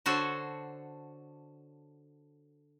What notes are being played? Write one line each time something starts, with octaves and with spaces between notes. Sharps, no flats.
D3 F#4 A4 C5 C#5